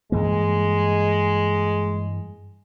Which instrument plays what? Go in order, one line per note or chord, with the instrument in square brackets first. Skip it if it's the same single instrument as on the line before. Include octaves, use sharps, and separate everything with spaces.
[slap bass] G2 E3 A#3 [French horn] G#3